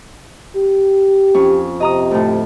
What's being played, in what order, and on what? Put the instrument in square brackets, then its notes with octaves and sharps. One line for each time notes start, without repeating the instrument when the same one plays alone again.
[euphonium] G4
[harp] F2 C#4 C#6
[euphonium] C3 [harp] D#5 A#5 D#6
[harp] D2 A2